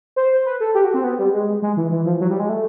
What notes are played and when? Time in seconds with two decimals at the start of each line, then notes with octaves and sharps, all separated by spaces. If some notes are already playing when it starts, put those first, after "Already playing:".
0.16 C5
0.46 B4
0.60 A4
0.75 G4
0.84 F#4
0.94 C4
1.04 B3
1.19 G3
1.33 G#3
1.62 G#3
1.77 E3
1.91 E3
2.06 F3
2.20 F#3
2.30 G3
2.40 G#3
2.49 A3